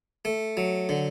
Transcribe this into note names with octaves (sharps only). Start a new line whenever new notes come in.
A3
F#3
D3